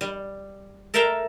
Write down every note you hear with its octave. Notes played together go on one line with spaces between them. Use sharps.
G3
A4 A#4 E5 F5 G5 A#5